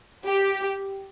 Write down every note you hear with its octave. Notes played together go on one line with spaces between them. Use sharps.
G4